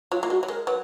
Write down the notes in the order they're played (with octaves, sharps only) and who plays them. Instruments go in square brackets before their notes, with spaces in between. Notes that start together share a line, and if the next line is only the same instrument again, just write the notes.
[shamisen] F#3 [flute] F4
[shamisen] A#3 [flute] F4
[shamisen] G#3 [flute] F#4
[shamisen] F#3
[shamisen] G#3 [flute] A#4
[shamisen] F#3 [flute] B4